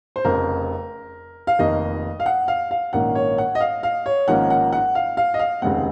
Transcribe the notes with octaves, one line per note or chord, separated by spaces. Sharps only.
C5
F1 F2 C#3 A#4
F5
F1 F2 D#3 A#3 D#5
F5
F#5
F5
F5
A#1 G#2 D#3 A#3 C#4 F#5
C#5
F#5
D#5
F5
F5
C#5
G#1 G#2 F3 A#3 C#4 F#5
F#5
F#5
F5
F5
D#5
F5
F1 D#2 C#3 G#3 C4 F#5